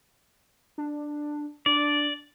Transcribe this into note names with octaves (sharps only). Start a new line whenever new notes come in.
D4
D4 D5